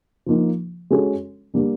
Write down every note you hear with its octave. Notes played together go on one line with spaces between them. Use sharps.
F3 A#3 D#4
G#3 C#4 F#4 A4 C#5
G3 A#3 D4